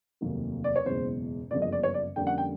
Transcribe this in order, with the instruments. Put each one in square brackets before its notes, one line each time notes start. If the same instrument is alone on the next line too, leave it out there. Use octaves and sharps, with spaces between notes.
[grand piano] F1 D#2 D#3 F#3 A#3
D5
C#5
F#1 E2 B2 G#3 C5
G1 F#2 C#3 F3 A#3 D5
D#5
D5
C#5
D5
F2 D3 G3 A#3 C#4 G5
F#5
G5